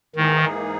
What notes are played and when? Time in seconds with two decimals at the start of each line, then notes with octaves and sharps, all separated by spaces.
0.15 G#2 D#3 E3 A#3 D#4 G#4